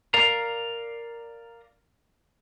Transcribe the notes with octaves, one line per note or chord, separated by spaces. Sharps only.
A#4 D5 F5 A#5